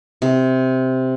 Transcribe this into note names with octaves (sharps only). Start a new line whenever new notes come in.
C3